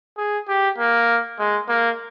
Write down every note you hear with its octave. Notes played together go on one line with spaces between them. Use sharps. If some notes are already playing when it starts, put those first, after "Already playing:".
G#4
G4
A#3
G#3
A#3